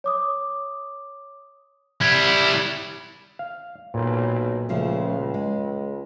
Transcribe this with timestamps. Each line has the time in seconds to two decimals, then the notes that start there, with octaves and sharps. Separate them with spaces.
0.04 C#5 D6 D#6
2.01 G3 E4 G#6
3.39 F5
3.94 B1 A#2
4.69 C#2 C#3 F3 A3
5.34 G#3